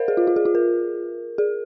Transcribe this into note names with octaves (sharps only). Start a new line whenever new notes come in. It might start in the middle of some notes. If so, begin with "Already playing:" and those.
Already playing: A#4 C5 D#5 F5
G#4
F4
F4
G#4
F4
A#4
G#4